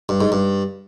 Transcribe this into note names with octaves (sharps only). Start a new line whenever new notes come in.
G2
G#2
G2